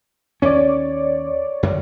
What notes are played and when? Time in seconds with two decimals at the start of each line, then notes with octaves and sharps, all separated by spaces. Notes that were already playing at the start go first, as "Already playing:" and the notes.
0.42 D#2 C#4 C#5 D5
1.63 F#2 D3 D#3